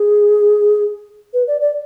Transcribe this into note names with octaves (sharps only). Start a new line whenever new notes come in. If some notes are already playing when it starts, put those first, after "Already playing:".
Already playing: G#4
B4
D5
D5